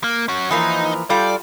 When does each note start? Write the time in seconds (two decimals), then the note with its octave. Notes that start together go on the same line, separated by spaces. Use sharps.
0.04 A#3
0.28 C#4 F#4
0.51 E3 F3 A#3 D#4
1.10 G3 F4 A4 D5